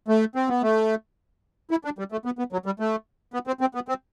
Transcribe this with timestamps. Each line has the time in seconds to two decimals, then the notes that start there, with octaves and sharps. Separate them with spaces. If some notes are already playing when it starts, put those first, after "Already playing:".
0.08 A3
0.35 C4
0.49 B3
0.62 A3
1.71 E4
1.85 D4
1.99 G3
2.12 A3
2.25 B3
2.39 B3
2.52 F#3
2.66 G3
2.80 A3
3.34 B3
3.47 C4
3.61 C4
3.75 B3
3.88 C4